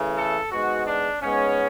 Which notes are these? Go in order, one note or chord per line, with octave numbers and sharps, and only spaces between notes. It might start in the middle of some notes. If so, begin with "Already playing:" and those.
Already playing: C#3 E3 A3
A4
G#2 G#3 B3 F#4
D4
G#2 G#3 B3 C#4